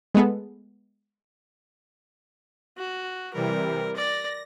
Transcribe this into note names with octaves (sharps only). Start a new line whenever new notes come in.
G#3 A3 B3 G#4 A4
F#4
C3 E3 G3 A#4
D5 A#6